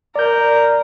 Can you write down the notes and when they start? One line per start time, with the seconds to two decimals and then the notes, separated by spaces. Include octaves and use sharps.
0.16 A#4 D5 G6